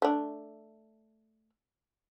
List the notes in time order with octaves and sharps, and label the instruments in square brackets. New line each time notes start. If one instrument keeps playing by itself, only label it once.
[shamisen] A3 D4